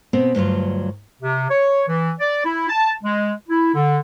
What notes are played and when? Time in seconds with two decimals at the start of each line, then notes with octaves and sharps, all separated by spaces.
0.13 B2 B3 C4
0.35 D2 G2 F#3 F4
1.22 C3
1.50 C#5
1.88 E3
2.20 D5
2.44 E4
2.69 A5
3.04 G#3
3.49 E4
3.75 D3